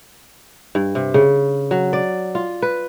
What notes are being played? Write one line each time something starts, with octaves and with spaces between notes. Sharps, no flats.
G2
C3
C#3
F#3
D5
F4
B4